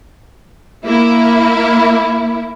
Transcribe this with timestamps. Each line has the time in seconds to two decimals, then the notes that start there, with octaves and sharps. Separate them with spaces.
0.85 A#3 E4